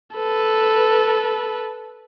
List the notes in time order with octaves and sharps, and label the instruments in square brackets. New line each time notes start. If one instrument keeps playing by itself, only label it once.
[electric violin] A4 B4